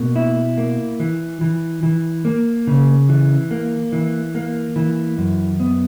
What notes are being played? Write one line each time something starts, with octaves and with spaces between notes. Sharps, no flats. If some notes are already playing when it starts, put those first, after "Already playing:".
Already playing: B2 A#3
E4
A#3
E3
E3
E3
A#3
C#3
E3
A#3
E3
A#3
E3
F#2
B3